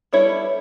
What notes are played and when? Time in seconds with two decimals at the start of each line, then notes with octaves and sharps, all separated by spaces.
0.13 G3 B3 E4 A4 C#5